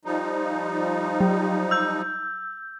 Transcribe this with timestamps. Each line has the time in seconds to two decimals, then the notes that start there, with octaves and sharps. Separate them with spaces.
0.05 F3 G3 D#4
1.21 F#3
1.71 E6 G6